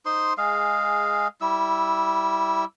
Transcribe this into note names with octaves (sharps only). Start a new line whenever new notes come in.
D#4 C5 C6
G#3 G#4 F5
G3 E4 E6